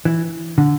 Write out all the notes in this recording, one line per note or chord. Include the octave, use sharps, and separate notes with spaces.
E3
D3